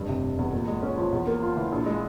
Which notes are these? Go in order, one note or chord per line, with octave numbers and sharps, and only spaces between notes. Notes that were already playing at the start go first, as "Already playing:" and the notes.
Already playing: F1 G2
C3
F1
E2
A#2
G#3
C#4
F3
E2
A#3
F4
E3
A#1
G#3